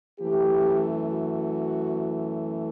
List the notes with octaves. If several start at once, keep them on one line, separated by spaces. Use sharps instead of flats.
F#2 E3 A3 G4
F#4